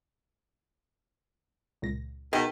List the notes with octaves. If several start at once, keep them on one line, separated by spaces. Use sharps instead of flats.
C#2 A#2 A#6
B2 D#3 G#4